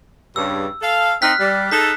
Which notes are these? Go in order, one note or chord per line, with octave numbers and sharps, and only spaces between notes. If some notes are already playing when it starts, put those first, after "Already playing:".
G2 C#3 E6
A4 F5
C4 D#4 F6 F#6 B6
G3
D#4 G#4 A4 F#6 B6